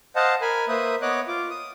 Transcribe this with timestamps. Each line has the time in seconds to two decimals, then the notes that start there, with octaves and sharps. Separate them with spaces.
0.16 C5 D#5 F5 F#5 A5
0.41 A#4 G#5 B5
0.68 A#3 B4 C5 E5 D#6
1.02 B3 C#5 D#5 D6 F#6
1.28 F4 D6
1.50 D#6